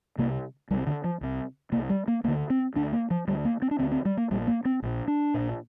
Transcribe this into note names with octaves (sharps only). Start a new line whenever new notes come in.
C2 C3 A#3
C2 C3 G3
D3
F3
C2 C3
C2 C3 A#3
G3
A#3
D2 D3 A#3
C4
D2 D3 D4
A#3
F3
D2 D3 G3
A#3
C4
D4
D2 D3 C4
C4
G3
A#3
A#1 A#2 G3
A#3
C4
A#1 A#2
D4
A#1 A#2